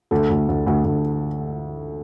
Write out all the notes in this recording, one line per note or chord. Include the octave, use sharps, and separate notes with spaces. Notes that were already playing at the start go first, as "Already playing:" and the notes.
D2 A4
D2
D2
D2
D2